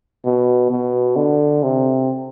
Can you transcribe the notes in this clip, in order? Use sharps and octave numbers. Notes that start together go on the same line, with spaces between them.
B2
B2
D3
C3